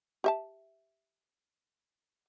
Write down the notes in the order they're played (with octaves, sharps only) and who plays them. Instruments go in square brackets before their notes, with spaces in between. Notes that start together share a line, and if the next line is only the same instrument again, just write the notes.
[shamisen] G4 E5 A5